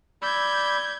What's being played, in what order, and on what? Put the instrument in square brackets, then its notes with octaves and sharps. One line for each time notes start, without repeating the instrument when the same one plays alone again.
[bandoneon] D5 B5 E6 [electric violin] G6 G#6